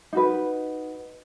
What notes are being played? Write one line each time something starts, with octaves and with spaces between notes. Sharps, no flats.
D#4 F#4 B4